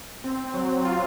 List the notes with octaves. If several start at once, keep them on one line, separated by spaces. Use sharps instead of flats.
C4
F#3
F4